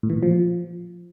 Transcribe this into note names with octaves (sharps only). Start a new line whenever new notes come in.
A2
E3
A#2
F3